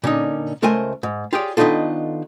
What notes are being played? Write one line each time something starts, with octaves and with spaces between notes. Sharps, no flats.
A#2 D3 C#4 D#4
C#2 A3 A#4 C5 G#5
G#2
F4 G4 G#4 C#5 D5
D#3 B3 D4 D#4 F4 A4